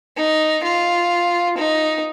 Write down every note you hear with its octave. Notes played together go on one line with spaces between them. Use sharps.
D#4
F4
D#4